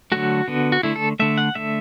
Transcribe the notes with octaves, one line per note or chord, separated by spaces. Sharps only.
D3 F#3 A3 F#4
D3 B3
F#4
D3 A3 E4
A4
D3 A3 E5
F#5
D3 A3 E5